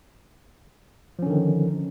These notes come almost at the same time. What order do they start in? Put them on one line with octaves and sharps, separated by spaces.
F3 C#4 D3 D#3